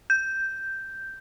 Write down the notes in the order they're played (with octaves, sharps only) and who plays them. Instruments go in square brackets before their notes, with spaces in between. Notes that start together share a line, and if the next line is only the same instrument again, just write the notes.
[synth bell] G6